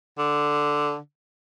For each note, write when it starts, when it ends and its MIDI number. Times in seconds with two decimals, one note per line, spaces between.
0.18 0.97 50